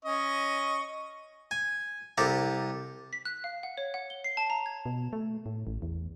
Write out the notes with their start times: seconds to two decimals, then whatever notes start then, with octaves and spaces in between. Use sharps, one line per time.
0.05 C#4 D#5 C#6
1.51 G#5
2.18 C2 G4 A4 A5 A#5
3.13 B6
3.25 F#6
3.44 F5
3.63 F#5
3.78 C#5
3.94 F#5
4.10 G7
4.24 C7
4.37 A5
4.50 A#5
4.66 G#6
4.86 B2
5.13 A3
5.46 A2
5.67 A1
5.82 E2